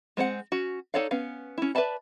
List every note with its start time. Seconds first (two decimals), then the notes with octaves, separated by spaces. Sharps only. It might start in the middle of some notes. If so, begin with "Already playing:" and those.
0.17 G#3 C4 C5 F#5
0.52 C#4 F#4
0.94 D#4 A4 C#5 D5 F5
1.11 B3 C#4 F5
1.58 C#4 E4
1.75 B4 D5 E5 A5 B5